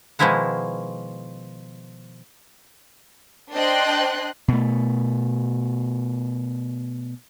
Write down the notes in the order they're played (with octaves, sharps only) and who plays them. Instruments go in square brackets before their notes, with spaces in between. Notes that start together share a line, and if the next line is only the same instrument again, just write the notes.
[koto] B2 D#3 F3 G#3 E4 F#5
[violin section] D4 C5 D#5 G5 C6 F#6
[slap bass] B2 A3